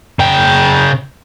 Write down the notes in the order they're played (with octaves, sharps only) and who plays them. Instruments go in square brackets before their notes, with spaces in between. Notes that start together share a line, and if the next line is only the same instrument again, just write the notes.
[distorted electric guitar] C#3 G5